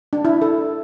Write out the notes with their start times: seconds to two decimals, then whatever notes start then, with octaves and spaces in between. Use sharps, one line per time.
0.13 D4
0.25 E4
0.42 A4